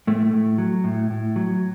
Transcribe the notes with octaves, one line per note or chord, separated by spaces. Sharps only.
A2 A3
A2
F#3
A2
A2
F#3